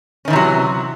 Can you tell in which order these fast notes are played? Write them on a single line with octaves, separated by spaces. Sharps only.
C#4 D#3 E3 C3 F#3